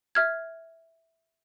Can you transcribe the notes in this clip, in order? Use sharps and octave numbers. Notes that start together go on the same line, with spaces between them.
E5 F6 G#6